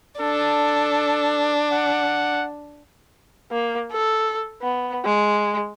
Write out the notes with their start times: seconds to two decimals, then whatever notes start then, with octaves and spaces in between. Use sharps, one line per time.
0.20 D4 A4
1.72 F#5
3.52 A#3
3.91 A4
4.62 B3
5.05 G#3